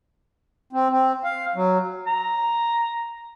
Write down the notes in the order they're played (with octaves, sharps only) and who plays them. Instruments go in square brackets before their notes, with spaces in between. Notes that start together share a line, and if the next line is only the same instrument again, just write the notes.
[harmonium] C4
C4
F5
F#3
[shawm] A#5